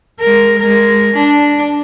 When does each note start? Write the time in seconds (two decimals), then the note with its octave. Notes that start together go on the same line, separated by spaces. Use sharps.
0.20 G#3 A#4
0.59 G#3 A#4
1.14 D4